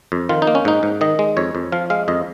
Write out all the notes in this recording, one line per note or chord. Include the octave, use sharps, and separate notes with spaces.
F2
D#3 F4
D#4
A#3
C#4
G#2 D#4
G#2
D#3 D#5
G#3
F2 C#5
F2
F3 F5
G#3 F5
F2 D#5